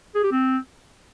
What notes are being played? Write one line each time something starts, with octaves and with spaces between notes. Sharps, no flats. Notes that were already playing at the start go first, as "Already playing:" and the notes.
G#4
G4
C4